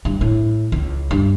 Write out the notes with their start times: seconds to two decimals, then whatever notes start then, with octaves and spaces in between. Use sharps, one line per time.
0.05 G2
0.21 A2
0.72 C#2
1.11 G2